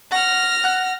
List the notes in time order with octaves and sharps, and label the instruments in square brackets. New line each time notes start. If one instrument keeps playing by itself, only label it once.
[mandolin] F#5 C#6 [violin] F6 A#6
[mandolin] F#5 F#6